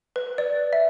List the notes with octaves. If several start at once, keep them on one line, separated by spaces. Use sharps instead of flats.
B4
D5
E5